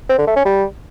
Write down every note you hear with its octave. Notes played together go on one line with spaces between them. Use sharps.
C4
D3
A3
C#4
G3